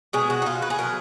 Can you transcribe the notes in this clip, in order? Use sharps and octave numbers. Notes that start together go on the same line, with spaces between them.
B2 G#3 G#4
F#4
D#4
F4
B4
G#4
B2 F#3 A#4